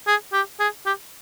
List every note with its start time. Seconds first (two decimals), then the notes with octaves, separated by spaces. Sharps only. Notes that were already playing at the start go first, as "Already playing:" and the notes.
0.07 G#4
0.33 G4
0.60 G#4
0.86 G4